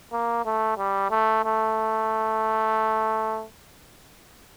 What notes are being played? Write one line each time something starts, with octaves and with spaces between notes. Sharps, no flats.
A#3
A3
G3
A3
A3